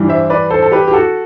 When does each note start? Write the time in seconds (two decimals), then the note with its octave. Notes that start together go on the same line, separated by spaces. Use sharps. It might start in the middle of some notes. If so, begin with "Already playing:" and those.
Already playing: G2 E3 G3
0.08 C5 E5
0.30 B4 D5
0.50 A4 C5
0.62 A4
0.72 G4 B4
0.88 G4
0.93 F#4 A4